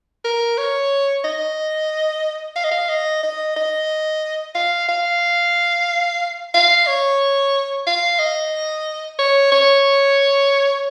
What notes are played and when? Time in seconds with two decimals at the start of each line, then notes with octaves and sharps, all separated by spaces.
0.24 A#4
0.58 C#5
1.24 D#5
2.56 F5
2.64 D#5
2.71 F5
2.89 D#5
3.23 D#5
3.56 D#5
4.55 F5
4.88 F5
6.54 F5
6.87 C#5
7.87 F5
8.19 D#5
9.19 C#5
9.52 C#5